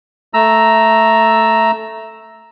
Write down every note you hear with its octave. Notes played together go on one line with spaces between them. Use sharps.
A3 A#5 E6